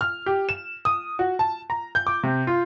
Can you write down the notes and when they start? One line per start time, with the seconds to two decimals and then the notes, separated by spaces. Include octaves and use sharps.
0.01 F6
0.26 G4
0.49 E7
0.85 D#6
1.19 F#4
1.39 A5
1.70 A#5
1.95 G6
2.07 D6
2.23 C3
2.47 F4